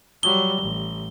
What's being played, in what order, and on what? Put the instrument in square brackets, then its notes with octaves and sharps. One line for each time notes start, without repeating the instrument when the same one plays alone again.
[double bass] F#3 G3 [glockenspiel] G7
[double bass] A1